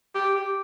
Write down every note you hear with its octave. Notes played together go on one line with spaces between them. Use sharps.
G4
G4